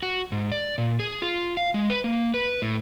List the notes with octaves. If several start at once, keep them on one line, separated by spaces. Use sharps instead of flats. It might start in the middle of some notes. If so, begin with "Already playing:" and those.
F#4
G#2
D5
A#2
G#4
F4
F5
G#3
B4
A#3
B4
A2